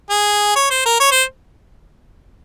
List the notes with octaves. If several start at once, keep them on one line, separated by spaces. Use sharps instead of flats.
G#4
C#5
C5
A#4
C#5
C5